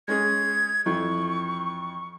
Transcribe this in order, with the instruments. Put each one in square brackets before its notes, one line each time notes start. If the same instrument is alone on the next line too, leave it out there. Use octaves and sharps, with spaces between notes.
[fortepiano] G#3 C#4 G#4 [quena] G#6
[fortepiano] F2 E3 [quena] C#6